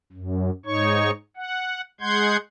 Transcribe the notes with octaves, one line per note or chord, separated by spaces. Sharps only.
F#2
G#2 D#4 C#5 C#6
F#5
G#3 F#5 C6 G6 G#6